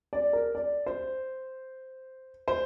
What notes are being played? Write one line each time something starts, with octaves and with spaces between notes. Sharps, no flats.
D5
A#4
D5
C5
C5